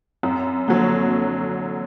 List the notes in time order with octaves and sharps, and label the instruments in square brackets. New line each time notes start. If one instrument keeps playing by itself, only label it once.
[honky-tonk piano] F#2 [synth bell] C4
[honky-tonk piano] D3 F#3 [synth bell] A#3